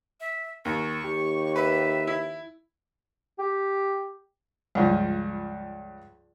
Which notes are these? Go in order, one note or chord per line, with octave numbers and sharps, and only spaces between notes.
E5
D#2 C#6
D#2 G4
B4 E5
E4
G4
C#2 G2 F3